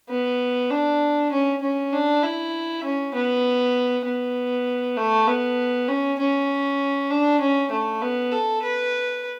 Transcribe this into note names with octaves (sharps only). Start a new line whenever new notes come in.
B3
D4
C#4
C#4
D4
E4
C#4
B3
B3
A3
B3
C#4
C#4
D4
C#4
A3
B3
A4
B4